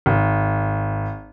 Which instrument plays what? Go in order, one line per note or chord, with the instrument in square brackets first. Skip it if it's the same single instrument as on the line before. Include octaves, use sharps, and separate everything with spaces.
[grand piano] G#1